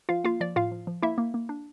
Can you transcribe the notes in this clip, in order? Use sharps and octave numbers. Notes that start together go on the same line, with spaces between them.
F3 F4 F5
A#3 F4 F5
F3 D5
A2 F4 F5
F3
F3
A#3 E4 E5
A#3
A#3
D4